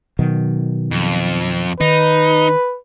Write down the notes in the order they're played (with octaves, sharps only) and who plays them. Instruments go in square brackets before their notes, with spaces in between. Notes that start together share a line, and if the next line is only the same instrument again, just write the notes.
[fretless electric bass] B2 D#3 F#3
[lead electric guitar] F2
[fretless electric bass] D#3 [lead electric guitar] D#4 [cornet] B4